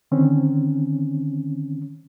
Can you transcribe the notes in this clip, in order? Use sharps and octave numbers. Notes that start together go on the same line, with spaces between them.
D3 D#3 C4 C#4